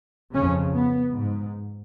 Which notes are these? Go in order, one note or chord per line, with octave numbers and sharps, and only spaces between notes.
F2 C#3 C#4
B3
G#2